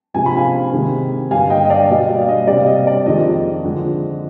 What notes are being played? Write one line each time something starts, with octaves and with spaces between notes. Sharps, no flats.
C3 F3 G#3 G#5
B5
F5 G#5
C3 D#3 G#3
G2 D3 G3 F5 G#5
D#5 G5
D#5
D5 F5
B2 G3 D#5
D5
F5
D#5
C3 G3 D5
F5
D#5
D5
F2 D#3 G#3 D#5
F2 D3 G#3